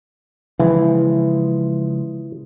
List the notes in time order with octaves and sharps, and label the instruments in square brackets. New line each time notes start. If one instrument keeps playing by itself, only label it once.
[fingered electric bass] C#3 F3 G#3 [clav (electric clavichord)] E3